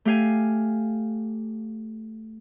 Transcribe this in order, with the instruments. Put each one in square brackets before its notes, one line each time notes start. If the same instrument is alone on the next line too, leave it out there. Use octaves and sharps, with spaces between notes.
[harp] A3 G4 F5 G#5